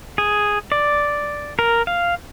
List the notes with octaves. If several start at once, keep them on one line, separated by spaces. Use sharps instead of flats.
G#4
D5
A#4
F5